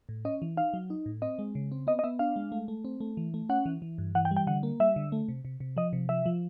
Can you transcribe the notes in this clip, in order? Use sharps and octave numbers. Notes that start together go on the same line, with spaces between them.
A2
C#4 D#5
E3
D#4 F5
F#3
D#4
A2
C4 D#5
G#3
C#3
C4
B3 D#5
D#5
B3 E5
D4 F5
G#3
A3
A3
C4
A3
E3
A3
C#4 F#5
E3
E3
G2
E3 F#5
G5
G3
G5
D3 F#5
A#3
G3 E5
D3
A3
C3
C3
C3
F3 D#5
C3
F3 E5
F3